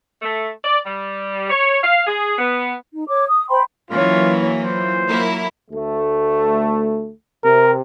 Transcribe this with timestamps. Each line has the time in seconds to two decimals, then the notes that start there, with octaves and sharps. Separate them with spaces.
0.22 A3
0.64 D5
0.84 G3
1.49 C#5
1.83 F5
2.06 G#4
2.38 B3
2.93 D#4
3.08 C#5 D6
3.28 D#6
3.49 C5 G5 B5 C6
3.90 E3 F#3 A#3 C#4 F4 C#5
4.64 F4 C5
5.09 F#3 A#3 E4
5.71 D2 A3
7.44 C3 A#4